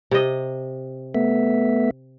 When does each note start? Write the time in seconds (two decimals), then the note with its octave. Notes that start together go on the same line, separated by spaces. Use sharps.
0.11 C3 D#5
1.15 A3 B3 E5